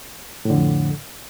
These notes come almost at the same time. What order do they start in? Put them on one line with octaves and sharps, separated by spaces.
A2 D3 F2